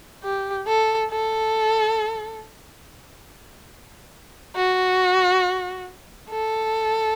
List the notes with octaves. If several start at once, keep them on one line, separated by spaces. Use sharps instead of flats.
G4
A4
A4
F#4
A4